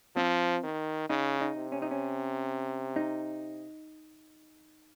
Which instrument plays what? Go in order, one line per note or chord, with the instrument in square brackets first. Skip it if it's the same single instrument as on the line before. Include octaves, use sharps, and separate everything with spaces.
[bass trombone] F3 [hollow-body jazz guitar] C4
[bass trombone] D#3
[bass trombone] C#3 [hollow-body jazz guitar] D#4
[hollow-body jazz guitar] D#4
[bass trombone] C3
[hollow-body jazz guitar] C#4
D#4
C#4
D#4